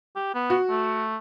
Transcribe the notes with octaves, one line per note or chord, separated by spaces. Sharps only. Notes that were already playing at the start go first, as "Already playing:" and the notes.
G4
B3
F#4
A3